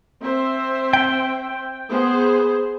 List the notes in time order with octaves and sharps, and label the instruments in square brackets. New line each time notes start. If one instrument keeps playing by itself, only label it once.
[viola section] C4 C5 E5
[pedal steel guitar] G5
[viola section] B3 G#4 C5